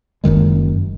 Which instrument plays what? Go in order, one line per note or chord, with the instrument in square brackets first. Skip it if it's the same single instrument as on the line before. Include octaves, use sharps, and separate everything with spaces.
[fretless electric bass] F#1 F#2 D#3 G#3